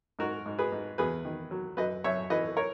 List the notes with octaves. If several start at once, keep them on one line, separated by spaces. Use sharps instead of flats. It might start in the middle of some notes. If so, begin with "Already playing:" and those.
G#2 F#4 A#4
G#2
G#4 B4
G#2
E2 G#4 B4
D#3
F#3
F#2 B4 D#5
F#2 C#5 E5
E3 B4 D#5
A#4 C#5